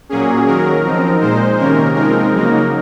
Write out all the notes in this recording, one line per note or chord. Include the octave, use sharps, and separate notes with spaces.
A#2 F#3 A#3 C#4 G#4
D#3 F#3 C#4 A#4
F3 C4 D#4
A#2 G#3 D#4 C5
C3 D#3 A#3 C#4 A#4
F3 G#3 C4 D#4 A#4
C#3 F#3 A#3 D#4